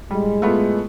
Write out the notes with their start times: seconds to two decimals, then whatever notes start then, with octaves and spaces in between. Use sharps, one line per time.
0.11 A2 G3 G#3
0.42 A3 B3 F4